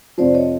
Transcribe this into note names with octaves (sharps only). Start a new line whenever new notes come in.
F2 C3 F3 C5 D5
C#5 D#5